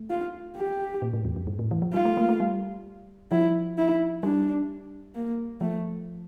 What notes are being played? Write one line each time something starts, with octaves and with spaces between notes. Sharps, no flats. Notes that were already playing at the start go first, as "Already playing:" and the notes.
Already playing: A3
F4
G4
A#2
A2
E2
F2
G2
A2
E3
F3
G3 F4
A3
A#3
A3
G3
F3 E4
E4
G3 D4
A#3
F3 A3